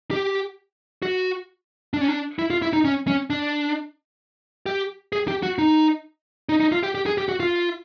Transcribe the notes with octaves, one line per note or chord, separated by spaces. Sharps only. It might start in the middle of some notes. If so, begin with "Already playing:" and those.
G4
F#4
D4
C#4
D4
E4
F4
E4
D#4
C#4
C#4
D4
G4
G#4
G4
F#4
D#4
D#4
D#4
F4
G4
G4
G#4
G4
F#4
F4